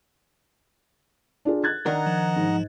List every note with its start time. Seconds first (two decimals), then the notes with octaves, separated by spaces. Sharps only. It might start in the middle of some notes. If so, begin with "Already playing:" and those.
1.45 D4 F4 G#4
1.64 F#6 G#6 A6
1.86 D#3 D4 A#4 D#5 F#5 A#5
2.07 F3
2.36 G#2